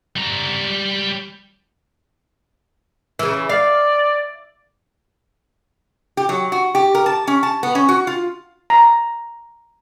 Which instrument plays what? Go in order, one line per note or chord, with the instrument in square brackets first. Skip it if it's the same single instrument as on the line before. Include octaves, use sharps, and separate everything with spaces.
[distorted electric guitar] G3 A#5
[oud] C#3 E3
[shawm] D5 [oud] F5
[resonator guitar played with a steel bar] G4
F#3
F#4
G4
A#4
A5
C#4
A5
B3
C#4
F#4
F4
[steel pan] A#5